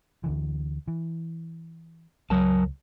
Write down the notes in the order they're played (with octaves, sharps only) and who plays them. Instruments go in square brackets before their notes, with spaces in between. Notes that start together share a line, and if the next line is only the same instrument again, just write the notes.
[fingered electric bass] D2 D3 E3
E3
[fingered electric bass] C#2 [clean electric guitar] F#3 A#4 A5